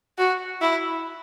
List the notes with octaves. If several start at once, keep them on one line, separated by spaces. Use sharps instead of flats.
F#4
E4